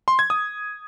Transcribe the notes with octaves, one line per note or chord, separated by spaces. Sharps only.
C6
G#6
D#6